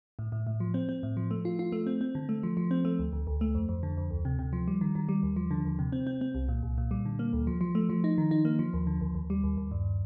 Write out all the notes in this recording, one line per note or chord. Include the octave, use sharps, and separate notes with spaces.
A2
A2
A2
F3
C4
C4
A2
F3
A3
F4
F4
A3
C4
C4
D3
A3
F3
F3
C4
A3
D2
D2
D2
A3
F2
F2
D3
F2
D2
C3
C3
F3
G3
D#3
D#3
G3
D#2
F3
D3
D#2
C3
C4
C4
C4
C2
A#2
C2
A#2
G3
D3
A#3
D2
F3
F3
A3
F3
D#4
D#3
D#4
A#3
F3
D#2
D3
D#2
D#2
G3
D#2
D#2
G2